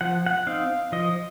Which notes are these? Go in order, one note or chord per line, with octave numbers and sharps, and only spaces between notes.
F3 F#5
F#5
C4 D#4 F5
F3 D#5